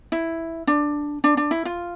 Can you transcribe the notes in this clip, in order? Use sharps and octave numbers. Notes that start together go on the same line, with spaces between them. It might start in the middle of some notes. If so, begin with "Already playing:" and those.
E4
D4
D4
D4
E4
F4